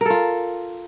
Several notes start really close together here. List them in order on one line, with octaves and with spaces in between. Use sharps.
A#4 A4 F4